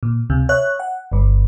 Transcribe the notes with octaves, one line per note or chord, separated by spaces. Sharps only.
A#2
C#2 C3
C#5 E5 F#6
F#5
G1 G2